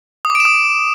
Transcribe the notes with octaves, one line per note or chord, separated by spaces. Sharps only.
D#6
D6
D7
E7
D#6